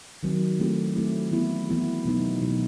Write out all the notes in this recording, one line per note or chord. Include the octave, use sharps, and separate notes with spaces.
D#3 F#3 C4 D#4
A3 C4 E4 G4
A3 C4 E4 G4
E3 B3 E4 G4
E3 B3 E4 G4
B2 F#3 B3 D#4
B2 F#3 B3 D#4